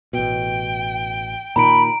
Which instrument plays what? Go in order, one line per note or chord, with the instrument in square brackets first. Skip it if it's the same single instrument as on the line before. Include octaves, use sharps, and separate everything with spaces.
[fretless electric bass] A1 B2 [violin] G5
[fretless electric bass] A#2 D#3 [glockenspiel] A#5 D7 [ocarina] B5